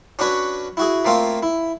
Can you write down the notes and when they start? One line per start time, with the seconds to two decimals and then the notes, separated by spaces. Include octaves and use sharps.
0.19 C#4 D4 F#4 B4 C#5
0.77 E4 F#4 G#4
1.05 A3 A#3 C4 F4
1.43 E4